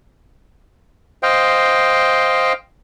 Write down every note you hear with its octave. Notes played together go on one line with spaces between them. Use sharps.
C5 D#5 F5 G5